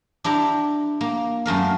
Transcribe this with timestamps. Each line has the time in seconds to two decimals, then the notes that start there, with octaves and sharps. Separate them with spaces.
0.24 D4 E4 G4 A#5
1.01 A#3
1.46 F#2 A3 A#4 F5